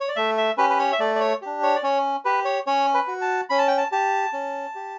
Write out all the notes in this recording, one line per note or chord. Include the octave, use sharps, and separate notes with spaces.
C#5
D5
A3 E5
E5
C#4 G4 B4
B4
C#5
E5
A3 D5
D5
C#5
D4 G4
C#5
D5
C#4 C#5
G4 B4
C#5
C#4 C#5
B4
F#4
A5
C#4 B5
A5
G5
A5
G4 A5
C#4
G4